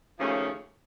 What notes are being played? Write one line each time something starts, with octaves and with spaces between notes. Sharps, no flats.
D#2 C#3 F3 A3 C#4